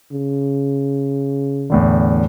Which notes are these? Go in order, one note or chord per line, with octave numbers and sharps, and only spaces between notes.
C#3
E2 A2 D3